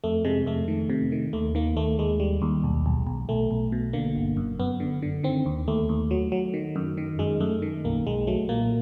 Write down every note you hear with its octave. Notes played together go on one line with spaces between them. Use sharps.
F2 A3
C3 G#3
F2 A3
D#3
C3
D#3
D#2 A3
D#3 A#3
D#2 A3
D#2 G#3
G3
D#2
B1
B1
B1
B1 A3
B1
B2
D3 A#3
G1
F#2
F#2 B3
D3
D3
D#3 C4
D#2
D#2 A3
D#2
F#3
F#3
D#3
F#2
D#3
F#2 G#3
F#2 A3
D#3
B1 A#3
B1 G#3
F#3 A3
A#2 A#3